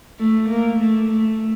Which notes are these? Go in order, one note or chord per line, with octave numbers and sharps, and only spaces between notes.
A3
A#3
A3
A3